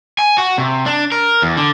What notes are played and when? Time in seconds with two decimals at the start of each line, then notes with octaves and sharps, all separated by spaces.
0.19 G#5
0.38 F#4
0.58 C3
0.86 D4
1.12 A#4
1.42 E2
1.57 D3